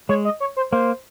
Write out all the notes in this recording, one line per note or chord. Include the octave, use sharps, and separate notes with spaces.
G#3 C#5
D#5
C#5
C5
A#3 C5